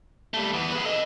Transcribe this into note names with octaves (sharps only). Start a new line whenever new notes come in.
G3 A3
E3 B3
G#4 B4
A4 D#5